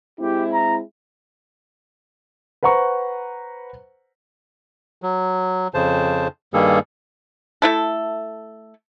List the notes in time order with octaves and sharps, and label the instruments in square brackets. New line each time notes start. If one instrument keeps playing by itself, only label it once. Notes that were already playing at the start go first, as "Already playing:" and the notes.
[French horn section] G#3 C4 E4 [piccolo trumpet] G4
[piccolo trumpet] A#5
[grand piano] B4 C5 F#5 A#5 C#6
[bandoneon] F#3
F2 C#3 C5 A5
G2 D#3 G3 A#3 G#4 A4
[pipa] A3 E4 A4